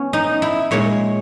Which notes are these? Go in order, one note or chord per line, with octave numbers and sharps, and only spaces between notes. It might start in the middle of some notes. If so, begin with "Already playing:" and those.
Already playing: B3 C#4
D#4
E4
A#2 G#3 C#5